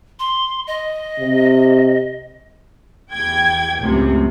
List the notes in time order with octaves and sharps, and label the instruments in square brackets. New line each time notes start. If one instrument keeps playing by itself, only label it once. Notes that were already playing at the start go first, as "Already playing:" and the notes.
[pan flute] C6
D#5
[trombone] C3
[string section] E2 G5 G#6
C#2 F#2 A2 C3